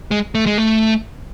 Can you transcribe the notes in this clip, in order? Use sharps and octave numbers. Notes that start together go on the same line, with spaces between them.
G#3
A3
G#3
A3